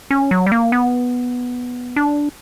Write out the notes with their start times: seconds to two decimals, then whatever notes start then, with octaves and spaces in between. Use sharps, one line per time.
0.11 C#4
0.31 F#3
0.47 G3
0.52 A#3
0.72 B3
1.96 D4